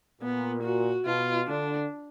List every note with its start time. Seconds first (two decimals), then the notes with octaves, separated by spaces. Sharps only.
0.21 A#2 B3
0.63 F#4
1.05 B2 F4
1.47 D3 D4